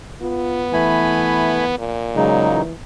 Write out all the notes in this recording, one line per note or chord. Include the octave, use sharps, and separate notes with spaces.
B3 F4
E3 A3 G#5 B5
A#2
C#3 F#3 G#3 D#4
E3